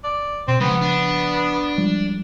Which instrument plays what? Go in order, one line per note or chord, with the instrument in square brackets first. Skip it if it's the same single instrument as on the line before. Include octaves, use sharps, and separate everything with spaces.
[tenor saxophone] D5
[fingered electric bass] B2 [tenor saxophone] C4
[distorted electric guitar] G#2 [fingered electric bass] C#3 F3 [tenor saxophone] B3
[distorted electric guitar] D4
[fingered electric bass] F3 G3 G#3